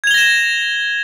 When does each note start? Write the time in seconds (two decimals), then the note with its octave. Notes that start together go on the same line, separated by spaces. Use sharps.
0.04 G#6
0.07 F7
0.11 G7
0.14 A#6
0.18 E7